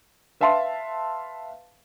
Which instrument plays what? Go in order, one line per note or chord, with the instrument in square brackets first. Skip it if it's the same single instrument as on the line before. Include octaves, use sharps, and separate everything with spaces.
[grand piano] B4 E5 F5 A5 C6